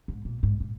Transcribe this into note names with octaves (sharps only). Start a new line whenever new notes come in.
G#2
A#2
G#2
A#2